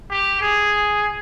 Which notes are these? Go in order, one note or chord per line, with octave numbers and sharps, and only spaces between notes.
G4
G#4